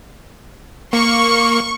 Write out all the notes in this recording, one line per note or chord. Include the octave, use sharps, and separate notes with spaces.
A#3 C#6